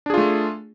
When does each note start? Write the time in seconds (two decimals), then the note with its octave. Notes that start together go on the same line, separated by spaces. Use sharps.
0.06 D4
0.10 G#4
0.14 F4
0.18 A3